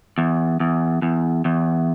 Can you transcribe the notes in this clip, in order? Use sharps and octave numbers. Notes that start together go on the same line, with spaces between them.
E2
E2
E2
E2